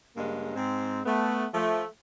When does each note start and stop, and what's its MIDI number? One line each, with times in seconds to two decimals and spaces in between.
0.16 0.55 43
0.16 0.55 49
0.16 0.55 56
0.16 0.55 58
0.56 1.01 44
0.56 1.01 60
1.06 1.46 57
1.06 1.46 59
1.54 1.83 53
1.54 1.83 57